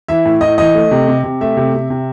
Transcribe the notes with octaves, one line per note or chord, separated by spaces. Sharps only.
E3 E5
A2
A2 D#5
E3 D#5
A3
C3
C3
C3
A3 E5
C3
C3
C3